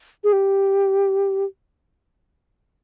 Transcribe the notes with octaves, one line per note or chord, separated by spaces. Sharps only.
G#4
G4